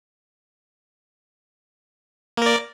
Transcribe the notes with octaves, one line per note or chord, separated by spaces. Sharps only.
A#3 A#4 D5